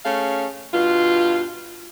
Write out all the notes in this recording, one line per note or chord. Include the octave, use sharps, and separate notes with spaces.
A3 C#4 G#4 F5
G2 B2 F4